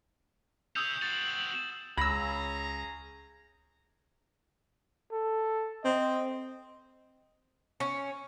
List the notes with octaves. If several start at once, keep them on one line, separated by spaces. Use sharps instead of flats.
C#4 G#4 D#6 E6 G6
C4 F#4 A6 F#7
C#2 C#4 G#4 A#5 B5 E6 A#6
A4
C4 D#5
C#4